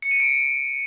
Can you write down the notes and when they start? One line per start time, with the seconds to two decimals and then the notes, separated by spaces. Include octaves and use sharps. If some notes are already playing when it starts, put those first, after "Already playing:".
0.02 C#7
0.11 D#7
0.20 D7